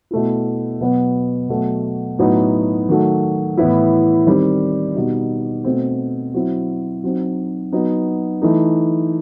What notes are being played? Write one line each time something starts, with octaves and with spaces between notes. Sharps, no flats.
B2 A3 E4
B2 F#3 B3
B2 F#3 A3
A2 F#3 B3 D#4
D#3 F#3 A3
A2 E3 B3 E4
D#3 G3 C4
B2 G3 D#4
B2 A3 C4
F#3 C4 E4
F#3 C4 D#4
F#3 B3 D#4
E3 A3 D#4